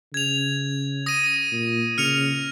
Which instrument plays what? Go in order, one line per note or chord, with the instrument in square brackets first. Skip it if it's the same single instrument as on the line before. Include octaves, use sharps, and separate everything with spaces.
[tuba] C#3 [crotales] G#6 F7
[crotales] D#6 A#6 D#7
[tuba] A#2
[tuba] C#3 [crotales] F6 C#7 F7